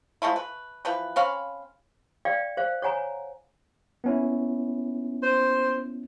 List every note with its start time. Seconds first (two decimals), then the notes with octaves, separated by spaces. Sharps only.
0.22 F3 G#3 A3 E4
0.36 B4
0.85 E3 F3 B4
1.16 C4 C#4 F5 B5
2.25 D5 F5 G5
2.57 C5 F5
2.82 C#5 F#5 G#5 A#5
4.04 B3 C#4 E4
5.23 C5